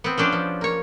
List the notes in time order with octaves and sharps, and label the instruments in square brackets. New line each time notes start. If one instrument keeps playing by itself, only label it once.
[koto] B3 C4
F3 C#4 D4 G4 G#4
F3
A#3 C#5